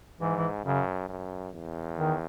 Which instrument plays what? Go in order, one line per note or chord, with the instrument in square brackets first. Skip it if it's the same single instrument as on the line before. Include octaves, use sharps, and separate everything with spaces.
[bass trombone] G#2 [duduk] E3
[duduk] E3
[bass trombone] F#2 [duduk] C#3
[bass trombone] F#2
E2
[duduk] D#3